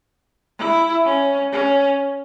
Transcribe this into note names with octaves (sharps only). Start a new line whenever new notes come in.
E4
C#4
C#4